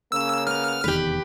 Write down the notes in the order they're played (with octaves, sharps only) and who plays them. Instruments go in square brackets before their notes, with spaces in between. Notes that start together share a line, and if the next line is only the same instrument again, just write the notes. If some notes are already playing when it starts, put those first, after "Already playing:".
[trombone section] C#3 A#3 C#4 [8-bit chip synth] E6
[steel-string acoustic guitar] B3 [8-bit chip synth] F6
[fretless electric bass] F1 E2 D#3 [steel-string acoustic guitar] G4 B4